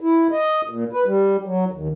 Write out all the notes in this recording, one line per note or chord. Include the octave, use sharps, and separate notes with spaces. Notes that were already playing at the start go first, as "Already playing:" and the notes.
E4
D#5
A#2
B4
G3
F#3
D#2